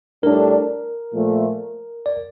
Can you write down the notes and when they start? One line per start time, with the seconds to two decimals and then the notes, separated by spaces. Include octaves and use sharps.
0.23 A2 G3 D4 A#4
1.14 A#2 F3 A3
2.06 D5